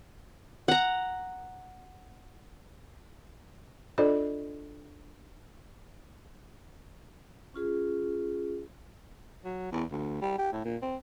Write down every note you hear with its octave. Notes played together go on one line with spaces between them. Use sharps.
F#5 A#5
D4 F4 A4 C5 D5 D#5
C#4 F4 G#4
F#3
E2
D2
G3
G4
A2
A#2
C4